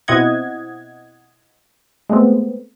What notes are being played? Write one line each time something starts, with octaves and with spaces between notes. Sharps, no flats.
B2 C4 E4 D#5 F#5 G#6
G#3 A3 B3 C4